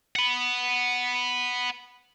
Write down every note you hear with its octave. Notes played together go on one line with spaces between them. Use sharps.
F#5 B5